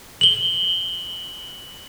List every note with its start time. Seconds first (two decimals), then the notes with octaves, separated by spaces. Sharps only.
0.21 F#7 G7